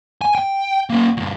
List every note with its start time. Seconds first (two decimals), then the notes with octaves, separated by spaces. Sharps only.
0.21 G#5
0.35 G5
0.90 A#3 C#4
1.17 D2 G2